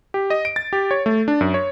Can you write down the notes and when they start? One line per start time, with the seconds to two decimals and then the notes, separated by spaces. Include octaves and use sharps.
0.14 G4
0.30 D#5
0.45 D7
0.56 A6
0.73 G4
0.91 C#5
1.06 A3
1.28 D4
1.41 F#2
1.54 C#5